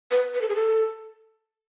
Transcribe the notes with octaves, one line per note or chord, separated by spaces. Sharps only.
B4
B4
A4
G#4
A4